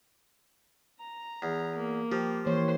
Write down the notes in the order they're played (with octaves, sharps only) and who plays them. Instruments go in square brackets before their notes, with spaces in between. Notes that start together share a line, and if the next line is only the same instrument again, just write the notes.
[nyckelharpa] A#5
[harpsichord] E2
[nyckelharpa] A#3
[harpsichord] F3 [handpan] G4
[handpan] E3 A#3 C#5 [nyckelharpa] C5 C6